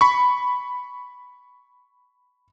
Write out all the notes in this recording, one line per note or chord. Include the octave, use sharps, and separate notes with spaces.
B5 C#6